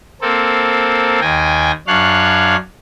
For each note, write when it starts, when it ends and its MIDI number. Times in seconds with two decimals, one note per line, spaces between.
0.22 1.20 58
0.22 1.20 60
0.22 1.20 69
1.21 1.71 39
1.21 1.71 79
1.21 1.71 80
1.21 1.71 94
1.87 2.56 42
1.87 2.56 62
1.87 2.56 73
1.87 2.56 77
1.87 2.56 90